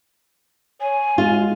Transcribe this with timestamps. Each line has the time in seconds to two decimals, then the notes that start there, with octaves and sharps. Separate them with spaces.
0.81 C#5 G#5
1.18 G#3 F4